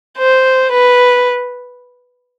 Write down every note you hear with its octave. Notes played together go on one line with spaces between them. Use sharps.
C5
B4